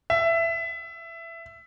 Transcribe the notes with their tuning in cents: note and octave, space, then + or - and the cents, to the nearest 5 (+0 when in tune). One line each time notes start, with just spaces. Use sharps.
E5 +15